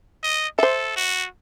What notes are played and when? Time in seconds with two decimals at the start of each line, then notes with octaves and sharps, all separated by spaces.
0.23 D#5
0.59 A4 C5 E5
0.96 F#4